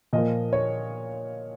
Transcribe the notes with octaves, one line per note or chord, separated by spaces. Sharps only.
A#2 F3 A#3 D#5
C#5